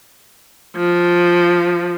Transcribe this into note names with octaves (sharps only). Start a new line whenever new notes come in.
F3